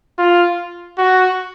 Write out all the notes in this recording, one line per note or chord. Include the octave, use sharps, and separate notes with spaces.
F4
F#4